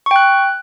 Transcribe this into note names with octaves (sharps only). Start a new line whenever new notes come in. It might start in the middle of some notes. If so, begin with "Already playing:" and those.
G5 C#6 F#6